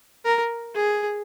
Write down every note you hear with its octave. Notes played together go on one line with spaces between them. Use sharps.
A#4
G#4